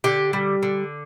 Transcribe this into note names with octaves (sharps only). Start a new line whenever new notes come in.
D3 G4
G3
D3